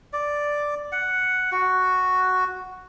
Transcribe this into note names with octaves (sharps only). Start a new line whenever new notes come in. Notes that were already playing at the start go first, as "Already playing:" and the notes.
D5
F#5
F#4